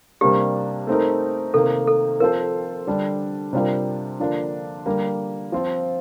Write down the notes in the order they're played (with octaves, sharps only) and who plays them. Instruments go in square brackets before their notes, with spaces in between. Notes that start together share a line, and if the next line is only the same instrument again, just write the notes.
[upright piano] C3 G3 A#3 D4 [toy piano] G4
[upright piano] A3 C4 D#4 A#4
[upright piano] C3 D#3 A#3 [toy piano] A4
[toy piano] A4
[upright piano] F3 C4 F4 A4 C5 [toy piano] A#4
[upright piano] D3 G3 D4 A4
C3 G3 D4 F4 A#4
D3 F3 A#3 D4 F4
D3 G3 A#3
F3 C4 F4